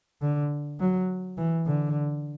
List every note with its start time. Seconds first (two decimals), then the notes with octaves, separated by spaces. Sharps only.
0.22 D3
0.80 F#3
1.38 E3
1.67 D3